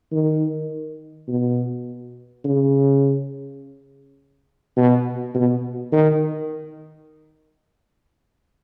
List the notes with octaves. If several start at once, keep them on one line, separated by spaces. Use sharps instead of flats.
D#3
B2
C#3
B2
B2
D#3